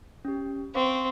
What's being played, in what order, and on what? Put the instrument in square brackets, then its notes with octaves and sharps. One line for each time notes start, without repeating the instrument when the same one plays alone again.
[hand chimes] C#4 G4
[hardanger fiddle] C4 [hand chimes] F5 C#6 D6